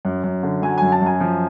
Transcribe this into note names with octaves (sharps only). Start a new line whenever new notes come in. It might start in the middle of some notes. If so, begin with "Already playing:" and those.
F#2
F#2
D3
F#3 G#5
F#2 G#5
A5
F#2
G#5
F3